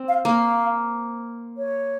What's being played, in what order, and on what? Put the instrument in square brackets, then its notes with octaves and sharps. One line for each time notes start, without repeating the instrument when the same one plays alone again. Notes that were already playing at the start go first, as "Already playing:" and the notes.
Already playing: [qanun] C4
[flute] F5
[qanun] A#3 [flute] F5
[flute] C#5